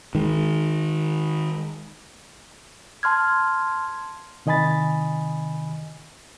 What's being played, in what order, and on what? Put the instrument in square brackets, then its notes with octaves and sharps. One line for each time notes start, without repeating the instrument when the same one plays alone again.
[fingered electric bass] D#3 G#3
[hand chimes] A5 C6 F6 G#6
[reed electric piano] C3 D#3 D#5 G#5 B5 A6